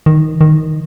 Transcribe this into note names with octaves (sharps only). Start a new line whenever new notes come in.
D#3
D#3